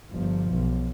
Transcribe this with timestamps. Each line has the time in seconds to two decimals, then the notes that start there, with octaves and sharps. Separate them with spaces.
0.12 G1 F3
0.51 B1